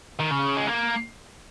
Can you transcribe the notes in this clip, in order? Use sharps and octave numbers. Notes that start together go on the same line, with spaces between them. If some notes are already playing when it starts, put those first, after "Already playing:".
D#3
C#3
G#3
A#3